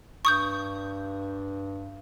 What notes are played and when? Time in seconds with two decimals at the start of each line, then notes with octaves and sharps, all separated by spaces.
0.25 G2 C#6 D#6 G6